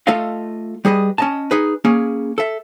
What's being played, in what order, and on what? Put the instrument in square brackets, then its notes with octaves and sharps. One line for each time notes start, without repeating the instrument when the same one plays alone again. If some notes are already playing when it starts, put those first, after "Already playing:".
[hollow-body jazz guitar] A3 F4 A4 D#5 F5
G3 G#4 B4 D#5
C#4 D#5 A5
D#4 G#4 B4
A#3 C#4 G#4
A4 E5